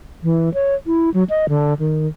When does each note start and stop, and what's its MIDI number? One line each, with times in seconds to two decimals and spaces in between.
0.23 0.52 52
0.54 0.75 73
0.86 1.10 64
1.14 1.24 54
1.30 1.46 75
1.49 1.74 50
1.79 2.07 51